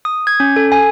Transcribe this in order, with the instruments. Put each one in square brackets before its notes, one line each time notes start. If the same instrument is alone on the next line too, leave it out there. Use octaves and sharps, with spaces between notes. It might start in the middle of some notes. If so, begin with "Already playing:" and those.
[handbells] D#6
G#6
C#4
A4
G#5